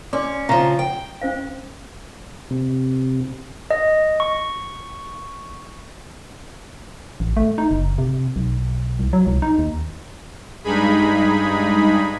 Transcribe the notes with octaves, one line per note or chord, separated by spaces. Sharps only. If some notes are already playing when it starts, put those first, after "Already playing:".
C#4 D5 C6 D6
C#3 F3 E5 A#5
G5
C#4 C5 F5
C3
D#5
C#6
A1
A3
D#4
F#1
C3
B1
C2
F#3
C2
D#4
D#2
G2 G#3 D#4 G#4 B5